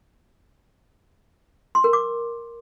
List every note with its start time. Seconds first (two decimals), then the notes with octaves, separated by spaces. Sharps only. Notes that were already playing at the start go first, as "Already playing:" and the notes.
1.75 C6
1.84 A#4
1.93 D6